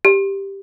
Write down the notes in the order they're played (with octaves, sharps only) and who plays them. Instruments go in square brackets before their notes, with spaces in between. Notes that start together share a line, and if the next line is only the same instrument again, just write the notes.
[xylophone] G4